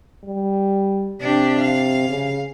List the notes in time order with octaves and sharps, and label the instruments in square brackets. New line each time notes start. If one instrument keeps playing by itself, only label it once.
[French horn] G3
[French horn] C3 [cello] D4 G4
[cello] F5
[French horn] C#3